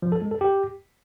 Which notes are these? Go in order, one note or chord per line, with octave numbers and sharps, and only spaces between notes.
F3
A4
G#3
A4
G4